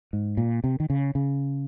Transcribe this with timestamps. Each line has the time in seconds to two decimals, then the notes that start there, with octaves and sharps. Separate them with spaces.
0.13 G#2
0.37 A#2
0.64 C3
0.80 D#3
0.90 C#3
1.15 C#3